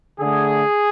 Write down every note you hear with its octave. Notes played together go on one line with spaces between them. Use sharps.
D3 A3 G#4